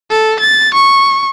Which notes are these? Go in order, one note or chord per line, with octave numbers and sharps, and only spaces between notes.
A4
A6
C#6